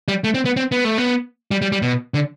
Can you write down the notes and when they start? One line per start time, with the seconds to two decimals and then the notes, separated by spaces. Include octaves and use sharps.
0.08 G3
0.24 A3
0.34 C4
0.45 B3
0.56 C4
0.72 B3
0.85 A3
0.98 B3
1.51 G3
1.62 G3
1.72 G3
1.82 B2
2.14 D3